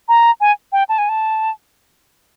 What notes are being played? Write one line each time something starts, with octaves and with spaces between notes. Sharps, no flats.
A#5
G#5
G5
A5
G#5
A5